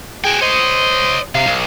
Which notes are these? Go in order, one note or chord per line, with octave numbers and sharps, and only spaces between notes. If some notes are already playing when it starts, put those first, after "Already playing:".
F#4 G#4 G5
C5 C#5 D#5
C3 F5
B1